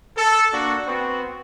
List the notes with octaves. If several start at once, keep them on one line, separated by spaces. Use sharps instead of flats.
A4
A#3 D4 F#4
B3 C4 F#4